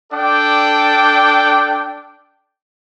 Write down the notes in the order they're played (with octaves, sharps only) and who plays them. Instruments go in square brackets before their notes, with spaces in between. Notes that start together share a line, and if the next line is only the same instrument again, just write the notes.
[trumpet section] D4 A4 D5 G5 D6